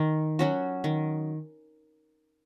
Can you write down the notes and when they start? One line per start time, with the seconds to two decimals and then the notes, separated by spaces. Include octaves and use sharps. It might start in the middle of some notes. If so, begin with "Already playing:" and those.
Already playing: D#3
0.39 F#3 C#4 F#4
0.84 D#3